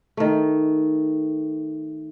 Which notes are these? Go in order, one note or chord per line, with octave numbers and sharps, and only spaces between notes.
D#3 A3